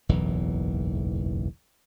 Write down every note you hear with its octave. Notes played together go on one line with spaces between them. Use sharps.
F#1 B1 E2 E3